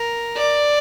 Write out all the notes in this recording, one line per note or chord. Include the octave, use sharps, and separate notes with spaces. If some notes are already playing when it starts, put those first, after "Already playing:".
Already playing: A#4
D5